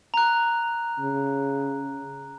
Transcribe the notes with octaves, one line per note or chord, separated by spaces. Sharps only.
A#5 F#6
C#3